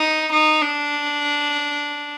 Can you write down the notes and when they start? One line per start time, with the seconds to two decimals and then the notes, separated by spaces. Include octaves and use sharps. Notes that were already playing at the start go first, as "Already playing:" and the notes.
Already playing: D#4
0.32 D#4
0.62 D4